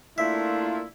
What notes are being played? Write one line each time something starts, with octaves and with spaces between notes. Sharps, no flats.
A3 A#3 D4 E4 F4 E5